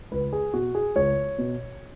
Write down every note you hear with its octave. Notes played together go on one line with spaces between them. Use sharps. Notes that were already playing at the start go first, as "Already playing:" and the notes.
C#2 B4
G#4
B2 F#4
G#4
C#2 C#5
B2